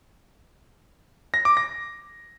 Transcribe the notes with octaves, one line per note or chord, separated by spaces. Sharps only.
A#6
D6
A#6